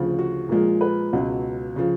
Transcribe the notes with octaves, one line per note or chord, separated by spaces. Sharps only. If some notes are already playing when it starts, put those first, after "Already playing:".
Already playing: D2 C#3 F3
F#4
A#2 F3 G#3
B4
C#2 B2 F#3
C#3 F3